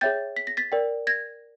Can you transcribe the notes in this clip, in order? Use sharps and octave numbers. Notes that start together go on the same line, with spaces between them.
G#4 C#5 E5 G5 G6 A6
B6
A#6
A6 B6
A#4 D5 G5
G#6 A#6